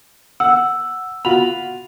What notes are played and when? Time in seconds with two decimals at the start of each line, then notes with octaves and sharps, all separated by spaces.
0.40 F#5 E6
1.25 F4 F#4 B5 F7